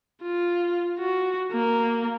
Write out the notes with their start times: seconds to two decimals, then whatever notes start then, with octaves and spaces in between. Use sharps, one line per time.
0.23 F4
0.99 F#4
1.52 A#3